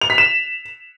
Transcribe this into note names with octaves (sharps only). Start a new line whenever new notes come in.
F7
B6
E7